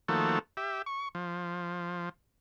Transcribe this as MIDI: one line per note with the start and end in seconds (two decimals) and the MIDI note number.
0.08 0.39 51
0.08 0.39 53
0.08 0.39 57
0.08 0.39 58
0.08 0.39 66
0.08 0.39 69
0.57 0.82 67
0.57 0.82 76
0.86 1.08 85
1.15 2.09 53